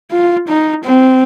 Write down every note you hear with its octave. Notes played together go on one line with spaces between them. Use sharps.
F4
D#4
C4